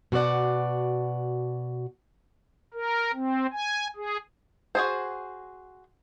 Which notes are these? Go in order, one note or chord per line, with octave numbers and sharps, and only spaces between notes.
B2 F#4 G#4 D5 F#5
A#4
C4
G#5
G#4
F#4 G#4 C5